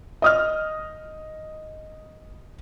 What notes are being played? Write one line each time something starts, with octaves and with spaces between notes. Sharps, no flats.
D#5 D#6 F6